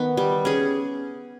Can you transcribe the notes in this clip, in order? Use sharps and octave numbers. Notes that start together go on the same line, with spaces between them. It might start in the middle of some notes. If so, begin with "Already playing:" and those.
Already playing: D#3 B3
G3
C#4 G#4